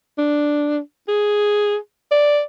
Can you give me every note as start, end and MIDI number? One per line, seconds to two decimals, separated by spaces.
0.18 0.79 62
1.08 1.77 68
2.11 2.42 74